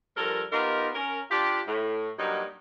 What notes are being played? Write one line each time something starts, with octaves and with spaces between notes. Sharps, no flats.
G2 F3 A4 A#4
B3 D#4 F4 G4 A#4
C#4 A#4
D4 F4 G4
A2
G2 F#3 A#3 D#4